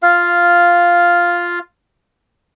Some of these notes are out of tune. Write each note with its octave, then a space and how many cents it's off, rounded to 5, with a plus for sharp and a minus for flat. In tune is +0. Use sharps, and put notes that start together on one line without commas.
F4 +0 F5 +0